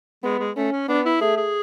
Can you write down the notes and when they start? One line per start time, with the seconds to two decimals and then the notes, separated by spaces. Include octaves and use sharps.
0.24 G#3 B3
0.40 G#3
0.56 A3 C#4
0.72 C#4
0.89 B3 D4
1.06 E4
1.21 A3 G#4
1.37 G#4